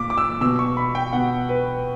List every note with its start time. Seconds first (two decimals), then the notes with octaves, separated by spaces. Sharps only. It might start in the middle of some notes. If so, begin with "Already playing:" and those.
Already playing: A#2 D6
0.10 D6
0.18 E6
0.41 B2 E6
0.59 C#6
0.77 B5
0.95 G5
1.13 B2 F#5
1.49 B4